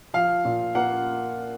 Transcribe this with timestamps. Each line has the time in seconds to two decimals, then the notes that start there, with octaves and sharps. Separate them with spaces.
0.14 F3 F5
0.45 A#2
0.75 A#3 F#5